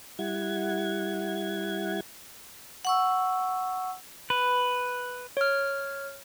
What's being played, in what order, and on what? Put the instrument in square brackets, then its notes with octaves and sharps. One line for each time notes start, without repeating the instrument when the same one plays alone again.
[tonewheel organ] G3 E4 F#5 G#6
[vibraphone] F#5 C#6 E6
[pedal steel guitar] B4
[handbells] C#5 F6